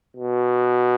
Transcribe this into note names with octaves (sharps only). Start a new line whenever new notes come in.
B2